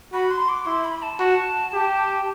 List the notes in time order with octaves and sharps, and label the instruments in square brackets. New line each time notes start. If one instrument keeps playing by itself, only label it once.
[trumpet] F#4 [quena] B5
[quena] C6
D6
[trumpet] E4 [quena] C6
[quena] B5
A5
[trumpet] F#4
G4